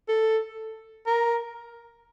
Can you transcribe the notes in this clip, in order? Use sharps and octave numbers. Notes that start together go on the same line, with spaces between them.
A4
A#4